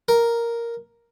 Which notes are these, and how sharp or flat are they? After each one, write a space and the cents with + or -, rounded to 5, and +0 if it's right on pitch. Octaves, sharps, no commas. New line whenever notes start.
A#4 +0